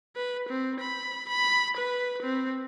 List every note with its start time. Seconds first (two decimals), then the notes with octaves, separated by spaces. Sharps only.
0.16 B4
0.49 C4
0.80 B5
1.29 B5
1.77 B4
2.22 C4